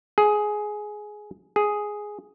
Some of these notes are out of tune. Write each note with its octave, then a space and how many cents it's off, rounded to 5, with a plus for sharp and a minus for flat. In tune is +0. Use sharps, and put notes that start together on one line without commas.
G#4 +10
G#4 +0